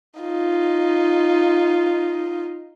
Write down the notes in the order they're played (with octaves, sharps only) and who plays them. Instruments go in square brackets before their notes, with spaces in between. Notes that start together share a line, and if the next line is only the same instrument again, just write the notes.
[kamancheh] D#4 F4